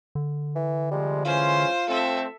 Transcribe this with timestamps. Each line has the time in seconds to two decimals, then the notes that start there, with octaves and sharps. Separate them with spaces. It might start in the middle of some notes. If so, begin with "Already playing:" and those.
0.15 D3
0.55 E3
0.91 C3 F3 G3 G#3
1.25 E3 G#3 C#4 F4 C5 C6
1.89 A3 C4 A4 E5